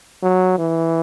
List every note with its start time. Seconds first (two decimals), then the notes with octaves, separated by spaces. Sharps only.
0.23 F#3
0.58 E3